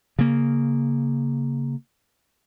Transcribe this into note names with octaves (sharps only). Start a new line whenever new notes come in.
C#3 A#3